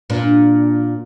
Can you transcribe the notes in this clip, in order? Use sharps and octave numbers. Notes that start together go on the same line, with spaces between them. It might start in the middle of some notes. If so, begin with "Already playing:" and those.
A#2 D4